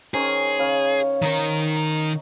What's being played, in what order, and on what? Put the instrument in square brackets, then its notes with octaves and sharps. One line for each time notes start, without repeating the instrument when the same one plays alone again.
[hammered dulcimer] D#3 C#4 C5 [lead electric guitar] G#4
[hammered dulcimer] C#3 C#5 F5
[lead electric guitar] D#3 A#4 [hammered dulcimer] D#4